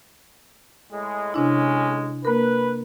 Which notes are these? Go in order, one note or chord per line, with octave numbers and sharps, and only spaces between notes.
A2 G#3
B1 C3 G#3 C#4 D4 E4
A#3 A#4 B4